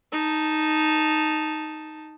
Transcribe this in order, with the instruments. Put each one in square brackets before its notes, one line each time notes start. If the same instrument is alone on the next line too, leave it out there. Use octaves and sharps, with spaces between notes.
[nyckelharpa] D#4 A5